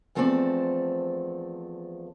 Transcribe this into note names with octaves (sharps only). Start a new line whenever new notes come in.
E2 F3 A3 C4 A4 D5